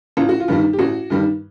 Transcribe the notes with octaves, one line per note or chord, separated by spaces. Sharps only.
A1 F4
F#4
F4
G2 D#3 G3
G4
A1 F#4
G2 D#3 G3